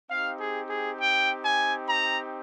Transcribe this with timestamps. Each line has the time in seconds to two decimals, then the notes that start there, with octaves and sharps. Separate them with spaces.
0.10 C4 D#4 G4 F5
0.40 G#4
0.69 G#4
0.99 G5
1.44 G#5
1.88 A#5